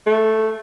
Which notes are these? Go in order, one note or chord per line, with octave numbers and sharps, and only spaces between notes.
A3